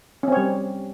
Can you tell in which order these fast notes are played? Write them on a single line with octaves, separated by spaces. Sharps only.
C#4 C4 C#5 G3